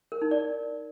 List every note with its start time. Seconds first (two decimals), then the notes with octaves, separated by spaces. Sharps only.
0.12 A#4
0.22 D#4
0.31 D5